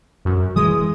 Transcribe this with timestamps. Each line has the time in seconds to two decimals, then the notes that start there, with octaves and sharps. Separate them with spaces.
0.25 F#2
0.56 E3 G#3 D#6